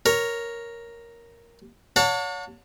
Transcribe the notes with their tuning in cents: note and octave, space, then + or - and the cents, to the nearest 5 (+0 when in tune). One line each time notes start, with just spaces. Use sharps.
A#4 +0 C#5 +0
C#5 +30 F#5 -40 A5 +35